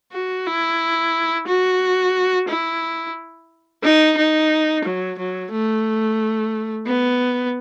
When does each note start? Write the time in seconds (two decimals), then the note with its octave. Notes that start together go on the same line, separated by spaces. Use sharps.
0.13 F#4
0.46 E4
1.47 F#4
2.48 E4
3.83 D#4
4.17 D#4
4.85 F#3
5.18 F#3
5.52 A3
6.87 B3